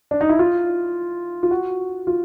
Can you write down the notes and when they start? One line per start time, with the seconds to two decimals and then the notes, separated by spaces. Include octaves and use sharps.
0.11 D4
0.21 D#4
0.29 E4
0.39 F4
1.43 F4
1.51 F#4
2.07 F4